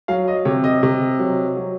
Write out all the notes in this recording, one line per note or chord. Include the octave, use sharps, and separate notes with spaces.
F#3 F5
D#5
C3 C#5
D#5
C3
F#3
F#3